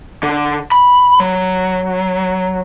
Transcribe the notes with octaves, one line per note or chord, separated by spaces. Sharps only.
D3
B5
F#3